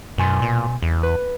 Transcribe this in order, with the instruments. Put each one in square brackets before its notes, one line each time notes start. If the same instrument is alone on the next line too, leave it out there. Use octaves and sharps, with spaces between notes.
[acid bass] F#2 [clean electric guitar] B2 G#5 C6
[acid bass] A#2
E2
[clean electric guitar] B4